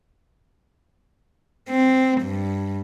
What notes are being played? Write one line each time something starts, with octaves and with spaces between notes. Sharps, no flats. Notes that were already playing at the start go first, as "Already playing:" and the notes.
C4
G2